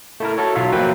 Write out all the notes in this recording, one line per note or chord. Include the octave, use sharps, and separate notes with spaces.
A3 E4 A#4
F#4 A4 C#5
B1 F#3 F4 E5 F5
F2 F#3 A#3 C4 B4 G5